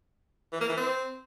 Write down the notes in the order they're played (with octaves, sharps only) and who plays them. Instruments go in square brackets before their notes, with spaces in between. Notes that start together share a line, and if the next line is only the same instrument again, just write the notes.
[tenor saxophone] E3
A#3
E3
C4